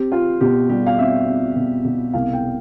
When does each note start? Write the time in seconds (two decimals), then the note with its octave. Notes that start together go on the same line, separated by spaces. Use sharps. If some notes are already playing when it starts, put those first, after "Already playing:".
Already playing: C4 G4
0.12 C4 F4
0.41 B2 G4
0.69 G3 G4
0.87 F5
0.98 C4 E5
1.27 C4
1.56 B2
1.85 B2
2.13 C2 F5
2.33 G5